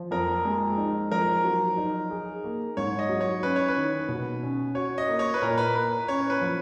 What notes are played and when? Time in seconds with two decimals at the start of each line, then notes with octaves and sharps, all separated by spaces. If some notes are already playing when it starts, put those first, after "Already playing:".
Already playing: F3
0.11 F2 A#4
0.45 G#3
0.77 D#4
1.12 F3 A#4
1.44 F#3
1.77 D#4
2.10 G#4
2.44 A#3
2.77 G#2 C#5
2.99 D#5
3.09 F#3
3.20 C#5
3.43 C#4 B4
3.56 C#5
3.68 B4
3.77 D#3
4.09 B2
4.43 C#4
4.75 F#4 C#5
4.98 D#5
5.09 A#3
5.19 C#5
5.34 B4
5.42 A#2 A#4
5.58 B4
5.74 A#3 B4
6.08 C#4 C#5
6.30 B4
6.41 F3